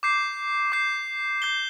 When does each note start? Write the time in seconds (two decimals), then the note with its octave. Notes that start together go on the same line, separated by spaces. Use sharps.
0.03 D6 G6 C7
0.72 D6 G6 C7
1.42 G6 C7 G7